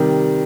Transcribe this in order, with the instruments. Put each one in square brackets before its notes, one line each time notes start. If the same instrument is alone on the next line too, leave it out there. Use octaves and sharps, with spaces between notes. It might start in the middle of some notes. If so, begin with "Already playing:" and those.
Already playing: [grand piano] C3 D#3 G3